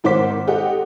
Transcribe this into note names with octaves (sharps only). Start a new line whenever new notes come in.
G#1 D#3 C5 F#5 D6 B6
G4 A4 D#5 F#5